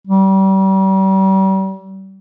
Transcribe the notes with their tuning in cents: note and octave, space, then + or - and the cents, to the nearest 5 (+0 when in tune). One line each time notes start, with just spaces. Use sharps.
G3 -35